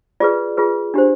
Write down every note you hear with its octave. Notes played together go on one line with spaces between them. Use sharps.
F4 G#4 B4 D5
F4 G#4 B4
D4 G4 C5